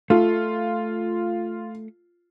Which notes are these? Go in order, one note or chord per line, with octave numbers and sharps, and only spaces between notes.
A3 F4